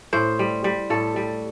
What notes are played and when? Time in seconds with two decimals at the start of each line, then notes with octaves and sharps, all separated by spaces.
0.13 A2 C5
0.39 G3
0.64 G3
0.90 A2 A4
1.16 G3